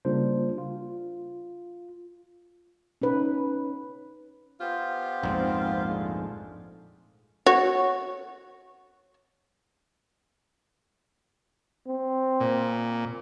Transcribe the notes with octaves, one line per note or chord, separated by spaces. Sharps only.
C#3 G3 A#3 D4 F4 C5
F4
C#4 D#4 B4
B3 F4 G4 C5
A#1 F2 G#2 C4
D3 G#3 A3
F#4 C#5
C4
A#2